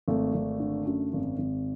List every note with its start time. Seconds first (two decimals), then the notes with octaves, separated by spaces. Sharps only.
0.08 G#1 A3
0.34 G#1
0.60 D3
0.86 F#2
1.13 G#1
1.38 G#1